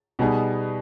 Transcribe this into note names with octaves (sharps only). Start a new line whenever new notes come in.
B2 G3 B3 D#4 G#4